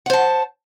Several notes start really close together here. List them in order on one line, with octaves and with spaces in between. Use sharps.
F#5 C5 A5